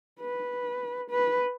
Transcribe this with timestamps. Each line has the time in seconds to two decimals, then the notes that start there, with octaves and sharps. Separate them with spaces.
0.21 B4
1.10 B4